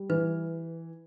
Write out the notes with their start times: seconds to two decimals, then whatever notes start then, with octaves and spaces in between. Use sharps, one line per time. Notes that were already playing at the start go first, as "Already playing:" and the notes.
Already playing: G3
0.10 E3 B4